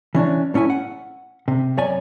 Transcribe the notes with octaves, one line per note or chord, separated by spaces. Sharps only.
E3 C#4 D4
A2 C#4 E4 G#5
F#5
C3
F#2 C#5 D5 G#5